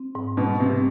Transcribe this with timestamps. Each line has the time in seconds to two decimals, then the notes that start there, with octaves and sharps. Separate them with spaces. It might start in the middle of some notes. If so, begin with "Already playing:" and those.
Already playing: C4
0.15 G#2
0.37 B2 G3
0.60 G#2 C3